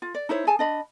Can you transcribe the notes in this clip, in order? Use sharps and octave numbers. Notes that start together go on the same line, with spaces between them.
F4
D5
D#4 E4 C5 C#5
G#4 G#5 A5
D4 D#5 B5